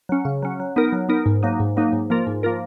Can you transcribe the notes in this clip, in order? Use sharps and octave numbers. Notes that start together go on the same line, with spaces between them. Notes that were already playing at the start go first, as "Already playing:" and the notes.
F#3 C#4
C#3
F#3 C#4
F#3
B3 D#4 A#4
F#3
B3 D#4 A#4
G#2
F#3 A#3 D#4
G#2
F#3 A#3 D#4
G#2
F3 A#3 F4 A#4
G#2
F3 A#3 F4 A#4